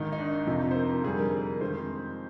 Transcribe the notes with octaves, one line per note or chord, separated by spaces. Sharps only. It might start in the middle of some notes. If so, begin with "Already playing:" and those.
Already playing: G#1 G#2 D#3 D#4
D#4
D4
D4
F2 C3 F3 D#4
C5
A#4
A#4
F2 D3 G3 G#4
A#4
A#4
F2 D#3 G#3 C5